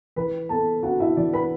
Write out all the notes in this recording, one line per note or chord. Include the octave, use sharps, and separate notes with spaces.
E3 B4 B5
B3 A4 A5
D4 F#4 F#5
E4 E5
E3 D5
B4 B5